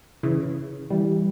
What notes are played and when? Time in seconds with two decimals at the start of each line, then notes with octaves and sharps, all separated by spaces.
0.23 C#3 E3
0.90 E3 G3